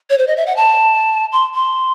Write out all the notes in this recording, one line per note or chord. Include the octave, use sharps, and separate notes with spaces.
C#5
C5
D#5
E5
F#5
A5
C6
C6